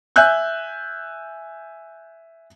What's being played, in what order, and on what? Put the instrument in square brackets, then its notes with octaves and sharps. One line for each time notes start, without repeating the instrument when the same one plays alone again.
[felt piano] E5 G#5 E6 F#6 G6